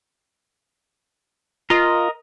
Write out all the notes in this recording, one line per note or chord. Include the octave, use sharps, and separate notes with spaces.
F4 A#4 D#5